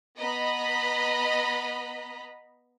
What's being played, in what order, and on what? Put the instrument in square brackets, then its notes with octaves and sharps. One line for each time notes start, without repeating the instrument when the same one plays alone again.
[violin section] B3 D#5 A#5 B5